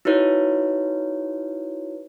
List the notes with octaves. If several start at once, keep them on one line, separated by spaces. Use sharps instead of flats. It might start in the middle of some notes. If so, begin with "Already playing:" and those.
D#4 E4 F#4 B4 C#5